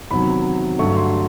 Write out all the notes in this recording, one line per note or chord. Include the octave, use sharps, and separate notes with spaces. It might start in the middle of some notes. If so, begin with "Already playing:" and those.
E2 C3 D#3 F#3 B5
G2 D3 F#3 A3 C#6
C6